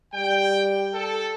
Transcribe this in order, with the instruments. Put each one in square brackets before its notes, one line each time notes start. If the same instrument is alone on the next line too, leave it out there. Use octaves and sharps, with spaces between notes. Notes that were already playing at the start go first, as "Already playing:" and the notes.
[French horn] G3 [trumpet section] G5
[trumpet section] A4